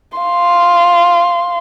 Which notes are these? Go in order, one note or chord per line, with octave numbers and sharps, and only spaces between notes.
F5 C6